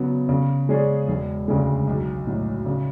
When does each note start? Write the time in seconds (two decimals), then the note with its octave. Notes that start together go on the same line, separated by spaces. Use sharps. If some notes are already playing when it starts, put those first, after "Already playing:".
Already playing: C#3 F#3 B3
0.29 C#3
0.69 G#3 C#4 G#4 D5
1.08 E1
1.48 D2 C#3 G#3
1.87 B1
2.27 A2 F#3
2.66 C#3